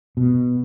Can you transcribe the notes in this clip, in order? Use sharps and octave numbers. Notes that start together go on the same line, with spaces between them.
B2